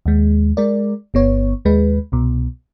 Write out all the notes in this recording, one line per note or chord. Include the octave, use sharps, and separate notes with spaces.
D#2 G#3
G#3 A#4 D5
G1 B3 C#5
D#2 G#3 B4
C2 B2